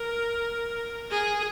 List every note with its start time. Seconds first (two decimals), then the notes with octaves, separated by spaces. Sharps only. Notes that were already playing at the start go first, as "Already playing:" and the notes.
Already playing: A#4
1.11 G#4